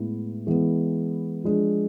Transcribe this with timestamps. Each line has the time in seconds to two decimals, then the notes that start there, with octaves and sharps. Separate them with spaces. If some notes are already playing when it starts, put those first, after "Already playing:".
Already playing: A2 G#3 B3 E4
0.47 E3 G#3 B3
1.44 F3 G#3 D4